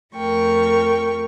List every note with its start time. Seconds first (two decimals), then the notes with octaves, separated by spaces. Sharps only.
0.15 F2 A3 A#4 G5 C#6